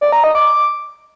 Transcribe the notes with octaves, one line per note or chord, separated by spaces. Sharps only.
D5
A#5
D#5
D6